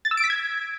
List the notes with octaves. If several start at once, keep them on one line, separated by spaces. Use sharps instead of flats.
A6
E6
D7
B6
G#6